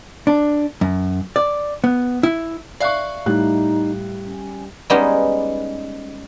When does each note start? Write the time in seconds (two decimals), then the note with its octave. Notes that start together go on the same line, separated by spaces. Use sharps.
0.27 D4
0.81 F#2
1.36 D5
1.84 B3
2.23 E4
2.81 D5 E5 F5 C#6 F#6 C7
3.26 A2 G3 D#4 F#6
4.25 C#4
4.90 G3 G#3 B3 C#4 D#4 G4